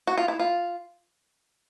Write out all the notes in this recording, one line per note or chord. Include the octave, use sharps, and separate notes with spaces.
F#4
F4
E4
F4